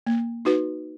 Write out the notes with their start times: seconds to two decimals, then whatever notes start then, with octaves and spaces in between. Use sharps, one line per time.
0.07 A#3
0.45 D#4 F#4 B4